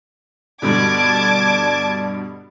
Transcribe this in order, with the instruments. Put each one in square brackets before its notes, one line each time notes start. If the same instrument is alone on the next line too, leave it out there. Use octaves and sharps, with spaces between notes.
[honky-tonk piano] G2 B2 D3 [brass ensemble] D5 [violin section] A5 D6 G#6